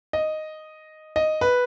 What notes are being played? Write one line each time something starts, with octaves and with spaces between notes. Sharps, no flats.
D#5
D#5
B4